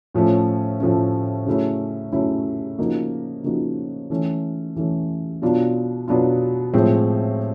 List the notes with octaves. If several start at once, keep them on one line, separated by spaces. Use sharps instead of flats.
A2 F3 A3 C#4
A2 F3 A3 C#4
C#3 F#3 A3 C#4 E4
C#3 F#3 A3 C#4 E4
C#3 F3 A#3 D#4 F#4
C#3 F3 A#3 D#4 F#4
E3 A3 C#4
E3 A3 C#4
B2 F#3 B3 D4 F4
B2 F#3 B3 D4 F4
A2 F3 G#3 C4